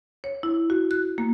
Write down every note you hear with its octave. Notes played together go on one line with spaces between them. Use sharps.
C#5
E4
F#4
F#6
A#3